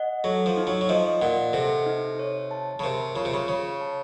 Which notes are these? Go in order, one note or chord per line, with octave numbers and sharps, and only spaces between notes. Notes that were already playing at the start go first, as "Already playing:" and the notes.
Already playing: D#5 F#5
F#3 A4
F3
D#4
F#3
F#3
F3 D#5
A#2 F#5
C3 A4
D#4
C#5
A5
C#3
C3 A#4
C#3 F4
C3
C#3
C#3 C#5
A5